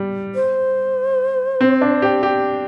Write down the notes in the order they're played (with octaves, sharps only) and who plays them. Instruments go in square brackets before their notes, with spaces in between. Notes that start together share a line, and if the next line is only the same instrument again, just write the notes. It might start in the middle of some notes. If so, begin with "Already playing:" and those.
Already playing: [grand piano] G3
[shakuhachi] C5
[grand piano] C4
D4
G4
G4